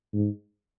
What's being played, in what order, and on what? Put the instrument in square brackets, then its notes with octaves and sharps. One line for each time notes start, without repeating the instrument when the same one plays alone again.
[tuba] G#2